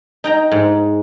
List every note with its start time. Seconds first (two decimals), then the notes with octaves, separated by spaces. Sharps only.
0.24 D#4 G5 A#5
0.52 G#2